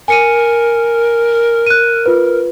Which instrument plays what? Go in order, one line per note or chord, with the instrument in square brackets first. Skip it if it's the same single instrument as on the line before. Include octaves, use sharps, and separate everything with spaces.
[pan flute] A#4 [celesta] G#5 C#7 D#7
[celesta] F#6 D#7
F4 B4